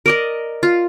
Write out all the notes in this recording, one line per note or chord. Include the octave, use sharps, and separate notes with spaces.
A#4 D5 D#5
F4